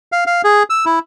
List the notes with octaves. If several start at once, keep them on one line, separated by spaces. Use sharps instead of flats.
F5
F5
G#4
E6
E4